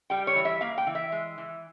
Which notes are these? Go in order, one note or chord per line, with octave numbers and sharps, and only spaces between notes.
G3 G5
C#5
E3
E5
A#3 F5
G5
E3
E5
G#3
E3